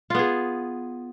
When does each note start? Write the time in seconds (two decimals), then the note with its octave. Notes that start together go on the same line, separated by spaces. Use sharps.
0.10 F4
0.15 B3
0.19 G#4